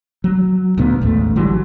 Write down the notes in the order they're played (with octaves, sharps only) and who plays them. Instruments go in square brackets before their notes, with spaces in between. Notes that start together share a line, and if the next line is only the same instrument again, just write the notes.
[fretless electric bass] F#3
D2 A#2 B3
A1 D#2 G#2 A3
D3 E3 F#3 G3